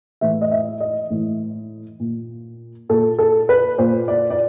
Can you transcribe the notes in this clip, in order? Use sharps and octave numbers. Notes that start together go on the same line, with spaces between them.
A2 E3 E5
D#5
E5
D#5
A2 E3
A#2
A#2 A4
A4
B4
A#2 C5
D5
D5